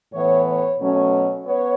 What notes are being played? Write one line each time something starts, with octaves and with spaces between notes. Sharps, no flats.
A2 E3 B3 C#5
C#5
B2 F#3 A3 C#4
B3 C#5